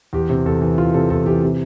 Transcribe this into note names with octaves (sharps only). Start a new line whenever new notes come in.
E2 G4
C3
E2 A4
E3
E2 F4
C3 A4
E2 A4
E3 G4
C3